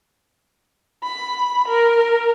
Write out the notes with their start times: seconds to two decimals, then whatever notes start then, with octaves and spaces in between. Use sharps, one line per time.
1.03 B5
1.68 A#4